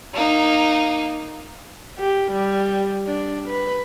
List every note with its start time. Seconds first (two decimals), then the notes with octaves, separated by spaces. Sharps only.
0.14 A#3 D#4
1.99 G4
2.32 G3
3.07 D4
3.49 B4